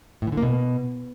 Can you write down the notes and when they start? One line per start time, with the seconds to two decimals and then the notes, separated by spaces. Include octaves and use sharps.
0.22 A2
0.27 E3
0.32 D3
0.37 A#3
0.43 B2